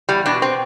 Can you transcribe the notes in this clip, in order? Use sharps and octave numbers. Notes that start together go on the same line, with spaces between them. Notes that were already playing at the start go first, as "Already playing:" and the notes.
E2 G3
B2 D4
C4